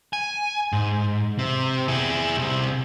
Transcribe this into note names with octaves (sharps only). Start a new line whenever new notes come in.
G#5
G#2
C3
E4 G#4
C2 C3